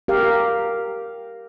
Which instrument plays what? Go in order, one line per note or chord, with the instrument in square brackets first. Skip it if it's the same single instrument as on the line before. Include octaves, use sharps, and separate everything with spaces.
[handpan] G4 A#4 F5